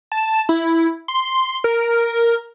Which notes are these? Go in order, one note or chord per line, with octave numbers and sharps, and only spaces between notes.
A5
E4
C6
A#4